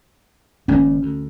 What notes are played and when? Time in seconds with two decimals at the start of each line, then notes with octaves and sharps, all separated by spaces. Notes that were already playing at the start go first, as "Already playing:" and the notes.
0.68 G#1 C#3 A#3 C#4
1.03 D2